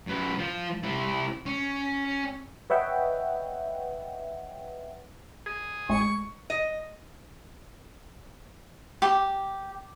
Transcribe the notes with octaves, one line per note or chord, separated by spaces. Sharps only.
F#2 B4
F3
C3 E4
C#4
B4 C#5 D#5 E5 F#5 G5
G#4
G#1 A2 G#3 C#6
D#5
G4